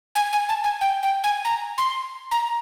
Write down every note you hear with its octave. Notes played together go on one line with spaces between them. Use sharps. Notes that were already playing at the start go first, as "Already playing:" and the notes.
G#5
G#5
A5
G#5
G5
G5
G#5
A#5
C6
A#5